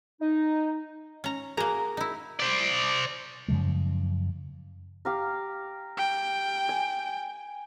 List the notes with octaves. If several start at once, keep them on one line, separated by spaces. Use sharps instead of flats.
D#4
C#4 A#5
A#3 F#4 G#4 A#4 A#5
D#4 E4
C5 D5
F#2 C#3 F3 G#3
G4 F5 A#5
G5
G#5